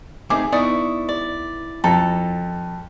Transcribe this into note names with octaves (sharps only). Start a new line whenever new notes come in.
A3 C4 D#4 G#4 D6
B3 D#4 E4 D5 C#6 D#6
D5
F2 A4 A#5